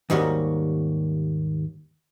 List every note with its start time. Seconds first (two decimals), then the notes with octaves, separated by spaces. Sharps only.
0.10 D#2 G#2 D#3 G3 C#4 F#4